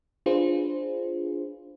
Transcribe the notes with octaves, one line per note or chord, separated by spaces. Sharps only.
D4 F4 G#4 B4 C5